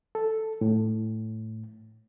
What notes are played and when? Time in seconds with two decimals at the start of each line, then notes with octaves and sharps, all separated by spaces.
0.15 A4
0.61 A2